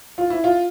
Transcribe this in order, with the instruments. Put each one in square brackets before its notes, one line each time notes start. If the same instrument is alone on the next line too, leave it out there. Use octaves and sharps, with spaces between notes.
[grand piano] F4
E4
F4